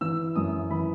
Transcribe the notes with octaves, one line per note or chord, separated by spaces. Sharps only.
E3 E6
F#2 D#6
E3 B5